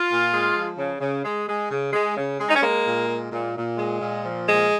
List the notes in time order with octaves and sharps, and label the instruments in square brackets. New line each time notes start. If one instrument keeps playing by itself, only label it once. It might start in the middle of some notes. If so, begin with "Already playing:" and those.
Already playing: [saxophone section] F4
A#2
G#3
F3
C#3
C#3
G#3
G#3
C#3
G#3
C#3
G#3
D#4
C#4
G#3 A#3
A#2
G#3
A#2
A#2
G#3
A#2
F3
A#2 G#3